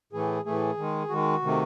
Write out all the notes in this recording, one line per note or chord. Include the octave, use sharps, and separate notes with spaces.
A2 E3 A3 G#4
A2 E3 A3 G#4
D#3 G#3
D#3 G#3 F#4
C3 D#3 A3